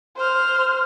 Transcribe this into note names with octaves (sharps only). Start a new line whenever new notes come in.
C5 F6